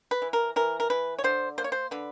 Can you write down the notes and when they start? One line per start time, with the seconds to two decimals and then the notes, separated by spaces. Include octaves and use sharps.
0.11 B4
0.22 E3
0.33 A#4
0.56 E3 A#4
0.80 A#4
0.90 E3 B4
1.19 C#5
1.24 D3 C5
1.58 A#3 C5
1.64 C#5
1.72 C5
1.91 D3 B4